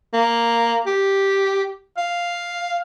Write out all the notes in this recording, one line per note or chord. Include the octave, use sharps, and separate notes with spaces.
A#3
G4
F5